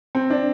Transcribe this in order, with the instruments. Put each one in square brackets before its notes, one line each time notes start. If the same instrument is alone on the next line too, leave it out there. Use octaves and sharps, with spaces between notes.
[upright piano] C4
D4